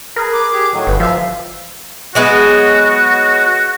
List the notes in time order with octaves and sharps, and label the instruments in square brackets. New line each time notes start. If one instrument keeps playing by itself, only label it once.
[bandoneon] G#4 B4 [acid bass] A#4
[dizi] D6
[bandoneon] G4 G#4
A2 D#3 F#3
[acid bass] G1 [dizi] B4
[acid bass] F3 [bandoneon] E5 [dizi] F5
[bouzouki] F#3 G#3 B3 [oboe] F#4